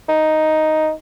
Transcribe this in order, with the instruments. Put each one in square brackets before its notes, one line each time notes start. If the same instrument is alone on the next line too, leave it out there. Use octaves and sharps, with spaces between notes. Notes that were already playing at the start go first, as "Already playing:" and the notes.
[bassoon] D#4